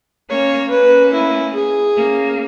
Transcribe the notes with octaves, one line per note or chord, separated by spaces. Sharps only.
A#3 C#4 C#5
A#3 C#4 B4
E4
G#4
A#3 C#4